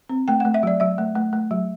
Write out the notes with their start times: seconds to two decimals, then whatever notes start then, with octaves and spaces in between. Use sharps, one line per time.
0.09 C4
0.28 A3 G5
0.40 F#5
0.45 A3
0.54 E5
0.63 F#3 D5
0.80 F#3 E5
0.98 A3
1.15 A3
1.33 A3
1.51 F#3